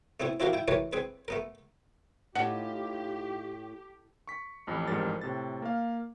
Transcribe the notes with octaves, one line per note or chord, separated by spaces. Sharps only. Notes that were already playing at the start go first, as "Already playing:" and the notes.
A3 B3 C4 E4
C4 E4 F#4 G4 A#4 F5
E4 G5
E3 A3 G4 A#4 B4 C#5
C4 G#4 B4
A3 B3 A#4
A2 D#4 F4 G4 F#5
C#6 B6
A1 F2 B5
A1 F2 G#2 G3 A#4 A6
A2 C3 A6
A#3 F5